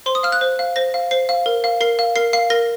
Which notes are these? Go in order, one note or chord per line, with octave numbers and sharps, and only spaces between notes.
C5 C6
D#6
F5 F6
F#6
C5
F5
C5 A#6
F5
C5 C7
F5
A#4
F5
A#4 C7
F5
A#4 C7
F5 C7
A#4 A#6